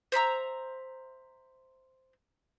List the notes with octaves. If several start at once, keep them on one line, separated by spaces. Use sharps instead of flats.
C5 E5 A#5 E6